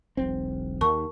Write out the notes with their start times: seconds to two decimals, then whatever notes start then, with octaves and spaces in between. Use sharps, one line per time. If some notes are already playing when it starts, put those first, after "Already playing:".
0.17 E1 B1 C4
0.81 D#2 A#4 A5 C#6